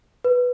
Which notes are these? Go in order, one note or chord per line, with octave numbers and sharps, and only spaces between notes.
B4